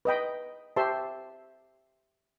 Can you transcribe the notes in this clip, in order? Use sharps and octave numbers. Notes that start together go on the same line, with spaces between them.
B4 D#5 G5 B5
G4 C5 E5 A5 C6